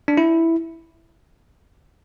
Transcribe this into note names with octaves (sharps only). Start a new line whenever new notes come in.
D4
E4